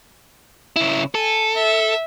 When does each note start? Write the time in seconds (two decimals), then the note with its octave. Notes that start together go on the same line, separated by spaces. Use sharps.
0.76 C#3 E4
1.15 A4 G#5
1.54 E5